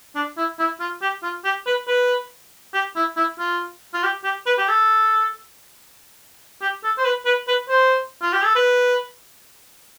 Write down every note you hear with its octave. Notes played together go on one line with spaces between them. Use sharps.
D4
E4
E4
F4
G4
F4
G4
B4
B4
G4
E4
E4
F4
F4
G4
G4
B4
G4
A4
G4
A4
C5
B4
B4
B4
C5
F4
G4
A4
B4